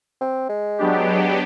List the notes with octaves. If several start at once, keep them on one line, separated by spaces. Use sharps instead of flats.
C4
G#3
F#3 B3 D4 G4